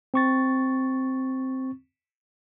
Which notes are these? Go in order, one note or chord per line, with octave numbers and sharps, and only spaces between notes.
C4 C#6 A6